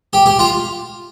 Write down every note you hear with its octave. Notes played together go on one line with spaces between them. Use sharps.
G4
G4
F4